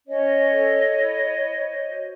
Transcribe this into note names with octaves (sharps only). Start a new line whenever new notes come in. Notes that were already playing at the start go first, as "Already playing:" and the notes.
C#4 C#5 D#5
A4
E4
C5
F#4